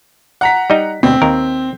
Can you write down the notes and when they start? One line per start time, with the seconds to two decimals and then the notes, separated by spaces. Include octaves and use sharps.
0.41 F#5 A#5 B6
0.70 G3 D#4
1.03 D2 B2 C4
1.22 D#2 A#4